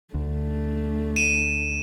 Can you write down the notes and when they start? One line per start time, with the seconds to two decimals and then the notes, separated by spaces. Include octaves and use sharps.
0.14 D2 A3 D4
1.16 D#7 E7